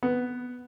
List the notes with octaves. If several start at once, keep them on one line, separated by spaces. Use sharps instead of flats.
B3